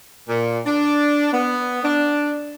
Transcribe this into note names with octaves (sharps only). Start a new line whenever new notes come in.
A#2
D4
B3
D4